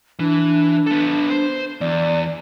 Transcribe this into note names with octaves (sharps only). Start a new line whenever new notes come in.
E3 D4
B3 A4
C5
E2 D5